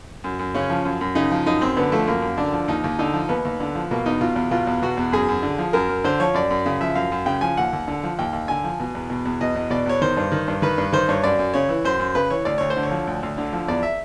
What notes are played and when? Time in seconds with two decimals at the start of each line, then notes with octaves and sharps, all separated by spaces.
0.24 F#2
0.39 F#2
0.55 C#3 C#4
0.70 F3
0.85 F#2
1.01 F#2
1.15 C#3 D#4
1.32 F3
1.46 F#2 D#4
1.61 F#2 C4
1.77 D3 B3
1.92 F3 A3
2.07 F#2 A#3
2.22 F#2
2.38 D3 D4
2.53 F3
2.68 D#2 D#4
2.84 D#2
2.99 D3 D#4
3.14 F3
3.29 D#2 B3
3.45 D#2
3.60 D3
3.75 F3
3.91 B2 A#3
4.06 E2 D#4
4.21 B2 F4
4.36 E2
4.51 B2 F4
4.67 E2
4.82 B2 F#4
4.97 E2
5.12 F#2 G#4
5.28 F#2
5.43 D3
5.58 F3
5.73 F#2 A#4
5.89 F#2
6.04 D3 C5
6.20 F3 C#5
6.34 F#2 D5
6.50 F#2
6.66 C#3
6.81 F3 E5
6.95 F#2 F5
7.12 F#2
7.26 C#3 G5
7.41 F3 G#5
7.57 D#2 F#5
7.73 D#2
7.88 D3
8.04 F3
8.19 D#2 G5
8.33 D#2
8.48 D3 G#5
8.64 F3
8.80 B2
8.95 E2
9.10 B2
9.25 E2
9.41 B2 D#5
9.56 E2
9.70 B2 D5
9.86 E2 C#5
10.02 D#3 C5
10.17 G2
10.32 D#3
10.48 G2
10.62 D#3 B4
10.78 G2
10.92 D#3 C5
11.08 G2 C#5
11.24 F#2 D5
11.39 F#2
11.54 C#3 C#5
11.69 E3
11.85 F#2 C5
11.99 F#2
12.15 C#3 B4
12.30 E3 C#5
12.45 D2 D5
12.58 D2 C#5
12.70 C5
12.76 D3
12.83 C#5
12.91 F3
13.07 D2
13.23 D2
13.38 D3
13.53 F3
13.68 E2 D5
13.83 E5